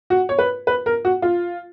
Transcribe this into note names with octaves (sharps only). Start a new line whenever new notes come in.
F#4
C#5
B4
B4
A#4
F#4
F4